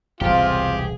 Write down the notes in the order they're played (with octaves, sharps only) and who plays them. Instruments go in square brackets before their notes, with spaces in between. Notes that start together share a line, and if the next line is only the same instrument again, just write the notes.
[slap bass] E1 C2 A2 [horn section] C4 F4 [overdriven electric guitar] G4 [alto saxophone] G#4